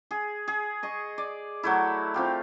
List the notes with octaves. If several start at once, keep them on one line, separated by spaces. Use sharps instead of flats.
G#4
G#4
D#5 C#6
D5
F#3 A3 E4
C4 F4 G4